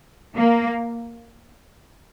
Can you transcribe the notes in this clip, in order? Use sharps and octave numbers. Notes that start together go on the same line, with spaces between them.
A#3